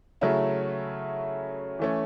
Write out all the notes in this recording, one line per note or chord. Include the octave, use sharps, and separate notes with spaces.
C#3 F#3 A3 C#4 E4
E3 A3 C#4